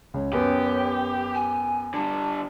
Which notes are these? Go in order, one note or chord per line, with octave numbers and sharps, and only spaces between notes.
C#2 C#5
F#2 B3 G4
G#5
D3 G3 A5